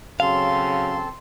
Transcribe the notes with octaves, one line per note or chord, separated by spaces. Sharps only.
C#3 F#3 C4 A4 F5 C6